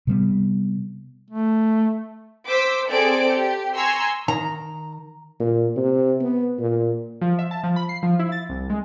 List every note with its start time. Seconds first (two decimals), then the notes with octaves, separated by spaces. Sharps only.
0.07 C3 G3 B3
1.30 A3
2.49 C5 D6 E6 B6
2.89 C4 G#4 A4 D5 D7
3.28 G4
3.74 G#5 A#5 C6 C#6 E6
4.28 D#3 A#5
5.40 A#2
5.77 C3
6.21 B3
6.59 A#2
7.21 F3
7.39 E5
7.51 A5
7.64 F3
7.76 B5
7.89 C7
8.03 F3
8.19 E4
8.32 A6
8.49 C2
8.70 G#3